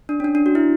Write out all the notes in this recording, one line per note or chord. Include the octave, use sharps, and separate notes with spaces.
D4
C#4
D4
D4
F#4
E4